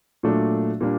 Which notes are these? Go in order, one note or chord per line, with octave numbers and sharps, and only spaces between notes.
A#2 F#3 A3 D4
A#2 G3 A#3 D4